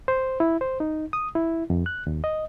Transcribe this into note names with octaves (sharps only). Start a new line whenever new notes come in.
C5
E4
C5
D#4
D#6
E4
F2
F#6
D#2
D#5